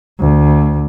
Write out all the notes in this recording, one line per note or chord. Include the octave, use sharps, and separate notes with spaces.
D2